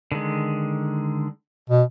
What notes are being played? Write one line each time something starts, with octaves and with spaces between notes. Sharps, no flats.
D3 D#3 G#3
B2